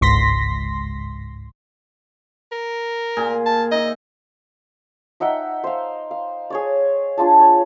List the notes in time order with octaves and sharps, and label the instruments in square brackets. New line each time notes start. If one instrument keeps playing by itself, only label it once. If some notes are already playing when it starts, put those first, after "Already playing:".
[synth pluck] G1 C#2 G#2 C6 A#6 B6
[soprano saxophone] A#4
[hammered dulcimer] A#2 G#4
[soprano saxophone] A5
[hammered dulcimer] D#4 E5 [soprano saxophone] D#5
[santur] D#4 E5 F#5 G5
C5 F5
F5
G#4 C#5 D5
D4 F4 G#4 A5
C#5